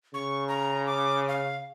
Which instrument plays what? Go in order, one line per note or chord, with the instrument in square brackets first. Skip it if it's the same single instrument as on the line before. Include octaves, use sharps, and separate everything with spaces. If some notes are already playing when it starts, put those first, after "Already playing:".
[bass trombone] C#3 [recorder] C#6
[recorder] A#5
D6
F5